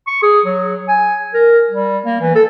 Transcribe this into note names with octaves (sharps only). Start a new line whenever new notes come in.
C#6
G#4
F#3
G#5
A#4
G3
A#3
E3
A4